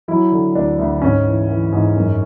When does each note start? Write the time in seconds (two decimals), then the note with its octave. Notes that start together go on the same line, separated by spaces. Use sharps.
0.08 F#3 E4
0.32 D3
0.55 D2 D4
0.78 D2
1.02 G#2 C#4
1.25 E3
1.49 E3
1.72 G#2
1.96 F#2